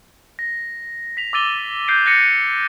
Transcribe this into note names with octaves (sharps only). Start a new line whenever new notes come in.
A#6
B6 F7
D6 E6 A6 D#7 G7
F#6 G6 C7 D7
F#6 A6 A#6 C#7 D#7